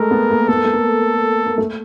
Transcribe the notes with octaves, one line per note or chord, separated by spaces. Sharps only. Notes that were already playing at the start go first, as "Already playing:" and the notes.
Already playing: G#3 A3 A#4
B3
A#3
B3 A4
A#3
A3
A#3
A#3
A3